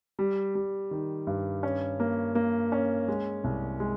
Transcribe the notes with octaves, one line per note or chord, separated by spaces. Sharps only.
G3
G3
D#3
G2
C#4
A#3
A#3
C#4
G#3
C2
G#3